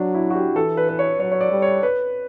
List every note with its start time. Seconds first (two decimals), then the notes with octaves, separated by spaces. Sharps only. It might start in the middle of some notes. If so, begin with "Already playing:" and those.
Already playing: F#3 D4 F#4
0.14 E4
0.30 F#4
0.35 G4
0.56 E3 A4
0.77 B4
0.89 B4
0.99 C#5
1.20 F#3 C#5
1.31 C#5
1.41 D5
1.51 G3
1.62 C#5
1.83 B4